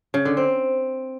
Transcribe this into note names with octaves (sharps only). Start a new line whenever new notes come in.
C#3
D3
C4